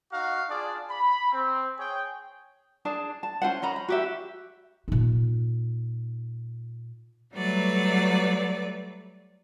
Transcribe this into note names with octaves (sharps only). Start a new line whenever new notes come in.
D#4 F#4 F5
D4 F4 G#4 D5
B5
C4
G#4 C#5 G5
D4 G#4 A5
A5
C#4 F4 C5 F#5
C#4 D#5 A#5 B5
B5
F#4 G4 E5
A#2 D#4
F#3 G3 A3 B4 D5